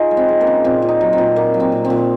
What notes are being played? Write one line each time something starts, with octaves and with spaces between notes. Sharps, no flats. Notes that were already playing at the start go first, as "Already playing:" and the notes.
Already playing: D#4 F4 G#4
G#3
C4
G#3
A#3
C#3
A#2 C4
A#2
D#4
F#3
C4
A#2
A#2 A#3
F#3
C4
A#2
C4
A#2